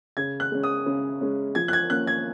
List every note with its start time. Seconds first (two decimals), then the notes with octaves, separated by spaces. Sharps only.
0.17 C#3 G#6
0.40 F#6
0.52 G#3 C#4
0.63 D#6
0.86 C#3
1.21 G#3 C#4
1.55 F3 G#6
1.68 F#6
1.73 G#6
1.90 A#3 C#4 F#6
2.07 G#6